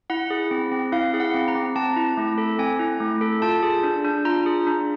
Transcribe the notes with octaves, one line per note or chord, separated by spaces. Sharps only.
E4 F#5
G#4
C4
C4
E4 F5
G#4
F#5
C4
A#5
C4
C4 A5
E4
A3
A4
C4 G#5
E4
A3
A4
F4 A5
G#4
D4
D4
F4 A#5
G#4
D4